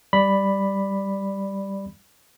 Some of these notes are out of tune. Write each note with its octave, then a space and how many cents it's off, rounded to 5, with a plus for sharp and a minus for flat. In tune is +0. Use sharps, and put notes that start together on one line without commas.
G3 +0 D5 +0 B5 +0